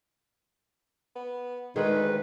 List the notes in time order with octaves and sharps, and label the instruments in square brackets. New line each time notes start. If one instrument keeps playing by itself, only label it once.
[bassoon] B3
[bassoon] D2 [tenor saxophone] D#3 [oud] G#3 [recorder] B4